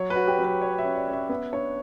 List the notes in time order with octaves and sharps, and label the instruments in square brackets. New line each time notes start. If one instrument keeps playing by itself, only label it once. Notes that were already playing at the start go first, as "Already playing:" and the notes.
Already playing: [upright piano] F#3 [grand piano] C#5
[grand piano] B4
[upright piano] F#4
[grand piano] G4
[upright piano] F#3
[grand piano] B4
[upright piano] C#5
[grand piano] E5
[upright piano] C#4
[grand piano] D5
[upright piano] C#4
[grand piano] E5
[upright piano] B3 [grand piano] E5
[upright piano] D4 [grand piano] C#5